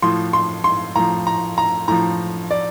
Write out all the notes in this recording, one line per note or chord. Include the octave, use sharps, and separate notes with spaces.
A2 F3 C6
C6
C6
A2 F3 A#5
A#5
A#5
A2 F3 A#5
D5